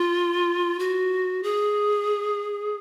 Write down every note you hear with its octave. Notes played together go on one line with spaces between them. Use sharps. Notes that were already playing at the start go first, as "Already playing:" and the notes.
Already playing: F4
F#4
G#4